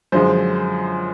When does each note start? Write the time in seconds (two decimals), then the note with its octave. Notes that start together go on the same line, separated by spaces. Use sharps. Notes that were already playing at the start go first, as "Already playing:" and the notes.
0.12 F#2 D3 F3 G#3 C5